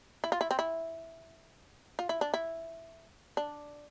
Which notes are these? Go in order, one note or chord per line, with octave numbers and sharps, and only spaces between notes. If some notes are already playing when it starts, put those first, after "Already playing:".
E4
F4
E4
C4
E4
F4
E4
D4
E4
D4